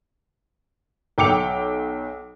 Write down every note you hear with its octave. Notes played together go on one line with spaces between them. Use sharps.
B1 G5 D6 C#7 F7